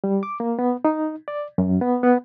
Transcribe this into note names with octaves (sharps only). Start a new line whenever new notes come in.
G3
D6
A#3
B3
D#4
D5
F#2
B3
B3